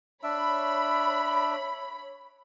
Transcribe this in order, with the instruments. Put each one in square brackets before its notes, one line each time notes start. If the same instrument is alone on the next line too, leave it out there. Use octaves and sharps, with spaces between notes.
[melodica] D4 E5 [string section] C#5 B5